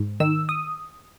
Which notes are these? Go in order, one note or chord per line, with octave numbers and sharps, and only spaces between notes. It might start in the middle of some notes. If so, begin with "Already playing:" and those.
Already playing: G#2
D#3 E6
D#6